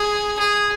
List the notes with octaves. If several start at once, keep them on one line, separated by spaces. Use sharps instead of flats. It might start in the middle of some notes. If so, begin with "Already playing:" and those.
Already playing: G#4
G#4